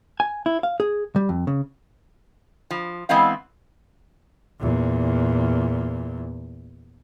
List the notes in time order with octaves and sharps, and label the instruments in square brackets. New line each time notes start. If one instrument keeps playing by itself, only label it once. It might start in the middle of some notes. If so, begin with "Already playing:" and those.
[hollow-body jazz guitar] G#5
E4
F5
G#4
G3
F2
C#3
[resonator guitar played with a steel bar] F3
E3 G#3 B3 C4 F5
[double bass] E2 A#2